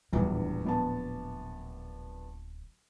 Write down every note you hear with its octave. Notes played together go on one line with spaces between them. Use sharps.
D1 A#1 E2 G2 C3
A#1 B3 A5